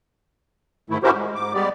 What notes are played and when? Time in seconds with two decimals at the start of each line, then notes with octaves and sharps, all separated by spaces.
0.90 G#2 D#3 A3 E4
1.03 C#4 E4 F#4 G4 A#4 C5
1.15 G#3
1.35 G#2 D6
1.54 G3 G#3 B3 G4 D5